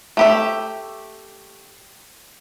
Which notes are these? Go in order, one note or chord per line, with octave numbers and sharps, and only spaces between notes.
A3 G4 E5